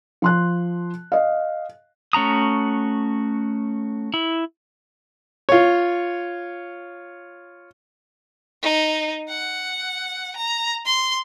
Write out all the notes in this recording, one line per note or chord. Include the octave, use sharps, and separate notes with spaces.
F3 C6 F#6
D#5 F5
A3 C#4 F#4 A#5 D#6
E4
F4 C#5
D#4
F#5
A#5
C6